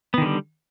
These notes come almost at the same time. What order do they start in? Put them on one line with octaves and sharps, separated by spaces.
B3 D#3 D3 G3